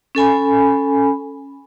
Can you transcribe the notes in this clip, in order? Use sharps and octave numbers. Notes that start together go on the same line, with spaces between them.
C#4 A4 G#5 B5